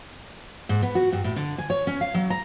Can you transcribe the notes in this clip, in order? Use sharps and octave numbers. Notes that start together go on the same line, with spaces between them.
G#2
B3
F#4
G2
A2
D3
G#5
C#5
C#4
F5
F#3
A#5